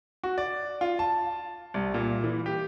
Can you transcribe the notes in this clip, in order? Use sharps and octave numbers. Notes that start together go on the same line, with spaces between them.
F#4
D5
F4
A5
C2
A#2
E3
G4